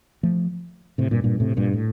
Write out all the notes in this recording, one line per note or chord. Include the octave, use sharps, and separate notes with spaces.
F3 A3
A2 C3
G2 A#2
G2 A#2
A2 C3
G2 A#2
A2